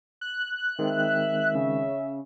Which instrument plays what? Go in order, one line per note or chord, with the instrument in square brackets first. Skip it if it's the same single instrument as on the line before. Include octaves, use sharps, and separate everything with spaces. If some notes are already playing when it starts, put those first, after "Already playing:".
[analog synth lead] F#6
[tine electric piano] D#3 G#3 C4 [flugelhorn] E5
[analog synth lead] C#3